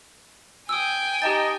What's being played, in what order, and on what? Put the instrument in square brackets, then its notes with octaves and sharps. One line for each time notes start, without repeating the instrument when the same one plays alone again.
[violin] G5 G#5 [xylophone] D#6 E6
[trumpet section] D#4 D#5 [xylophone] G4 A5 A6